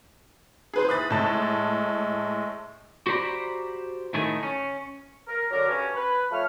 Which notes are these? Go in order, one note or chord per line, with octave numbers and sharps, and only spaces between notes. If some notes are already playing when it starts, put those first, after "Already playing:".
G#4 B4 C5
E3 B5 D#6 F#6 A6
A2 G#3 A5
F#4 G4 C5 D5 A#5 B5
A2 D#3 A3 G#4
C#4
A#4
D3 F#3 D4 A#4
G2 C#4
B4
F3 A3 C#5 F6